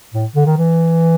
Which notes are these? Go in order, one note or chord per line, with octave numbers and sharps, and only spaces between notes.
A2
D3
D#3
E3